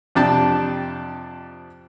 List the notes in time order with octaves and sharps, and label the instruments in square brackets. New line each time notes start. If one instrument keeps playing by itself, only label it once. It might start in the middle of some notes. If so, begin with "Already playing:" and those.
[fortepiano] F2 C3 D4 G5 A5